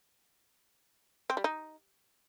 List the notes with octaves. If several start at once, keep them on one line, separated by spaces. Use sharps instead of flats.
C4
G3
D#4